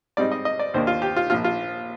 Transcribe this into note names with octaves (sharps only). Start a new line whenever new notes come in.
G#2 G3 C4 D#4 D5
D#5
D#5
D5
D#2 D#3 A#3 D4 C5
F4
G4
F4
A#1 A#2 F3 F4
F4